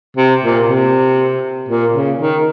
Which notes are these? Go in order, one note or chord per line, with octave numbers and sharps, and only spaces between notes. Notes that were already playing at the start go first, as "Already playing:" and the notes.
C3
A#2
C3
A#2
C#3
D#3